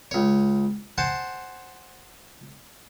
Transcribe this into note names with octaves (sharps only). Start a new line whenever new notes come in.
C#2 C#5
C5 F#5 G#5 A5 C6